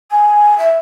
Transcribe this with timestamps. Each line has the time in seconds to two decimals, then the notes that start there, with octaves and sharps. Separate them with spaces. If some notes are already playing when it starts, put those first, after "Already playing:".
0.11 G#5
0.58 E5